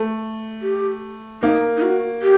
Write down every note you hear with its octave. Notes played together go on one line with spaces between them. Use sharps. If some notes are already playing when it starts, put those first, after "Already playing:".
Already playing: A3
G4
A#3 D#4
D#4
F#4
G4